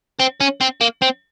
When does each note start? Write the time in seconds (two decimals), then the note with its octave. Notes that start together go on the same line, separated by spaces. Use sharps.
0.19 C4
0.41 C#4
0.61 C4
0.81 A#3
1.02 C4